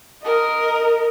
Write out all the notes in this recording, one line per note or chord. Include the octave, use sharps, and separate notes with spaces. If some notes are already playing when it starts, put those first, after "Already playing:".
A#4 D#5